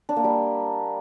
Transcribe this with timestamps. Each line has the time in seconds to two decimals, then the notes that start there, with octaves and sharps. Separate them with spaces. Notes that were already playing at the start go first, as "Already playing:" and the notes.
0.09 D4
0.16 A#3
0.24 G3